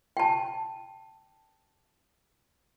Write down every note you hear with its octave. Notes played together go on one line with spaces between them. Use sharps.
G5 A5